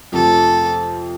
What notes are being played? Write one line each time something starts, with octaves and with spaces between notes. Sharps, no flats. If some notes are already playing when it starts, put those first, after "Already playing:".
F2 C3 F3 A3 A4